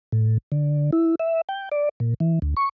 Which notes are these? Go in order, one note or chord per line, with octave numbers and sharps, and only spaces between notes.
A2
D3
E4
E5
G5
D5
A#2
E3
D2
C#6